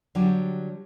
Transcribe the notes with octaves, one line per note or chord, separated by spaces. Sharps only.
D3 F#3 G3 D4 G4